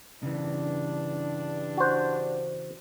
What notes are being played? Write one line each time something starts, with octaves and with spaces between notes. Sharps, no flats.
G2 C#3 E3 D4
F#4 C5